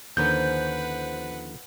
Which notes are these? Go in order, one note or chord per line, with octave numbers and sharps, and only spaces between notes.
D#2 D3 F3 C#4 A#4 B4 F#5 G6